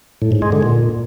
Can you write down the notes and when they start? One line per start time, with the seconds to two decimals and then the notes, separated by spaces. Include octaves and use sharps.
0.22 A2
0.32 G#2
0.42 G#3
0.52 D3
0.63 A#2